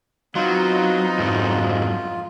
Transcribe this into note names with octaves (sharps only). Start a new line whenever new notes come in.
F#3 B3 C4 D#4 F4
F2 G#2 F#3